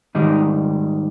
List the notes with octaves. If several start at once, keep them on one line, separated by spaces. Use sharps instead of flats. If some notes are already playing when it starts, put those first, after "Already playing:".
G#2 D#3 G3 D#4